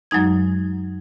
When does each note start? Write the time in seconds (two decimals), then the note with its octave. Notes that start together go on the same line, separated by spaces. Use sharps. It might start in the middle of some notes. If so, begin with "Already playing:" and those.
0.11 F#2 F#3 G#3 D#4 G#6